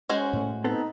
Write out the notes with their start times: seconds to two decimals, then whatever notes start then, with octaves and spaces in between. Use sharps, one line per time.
0.09 G#3 C#4 F#4 C5
0.33 A2 A3
0.64 B3 C4 D#4 A4